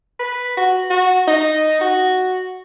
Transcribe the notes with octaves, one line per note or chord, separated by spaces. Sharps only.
B4
F#4
F#4
D#4
F#4